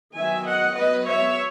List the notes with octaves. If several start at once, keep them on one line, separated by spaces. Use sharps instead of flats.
D#3 F#3 B3 E5 G#5
D#5 F#5
F#3 B3 B4 D#5
C#5 E5